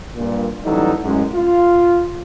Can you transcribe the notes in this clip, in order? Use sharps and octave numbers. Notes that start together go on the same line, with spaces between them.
G2 A#2
A1 E3 F#3 G3 D#4 A4
A1 F#2 G#3
F4